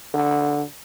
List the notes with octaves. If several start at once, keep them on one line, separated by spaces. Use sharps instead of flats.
D3